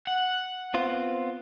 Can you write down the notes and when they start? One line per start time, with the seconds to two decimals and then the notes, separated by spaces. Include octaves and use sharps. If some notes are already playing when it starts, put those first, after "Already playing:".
0.07 F#5
0.74 B3 C4 F4